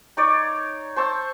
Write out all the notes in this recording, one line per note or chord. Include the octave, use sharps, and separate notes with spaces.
D#4 C#5 D5
C5 A5 C#6 E6